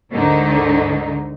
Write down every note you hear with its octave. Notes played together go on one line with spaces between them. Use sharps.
D2 G#2 D3 D#3 D#4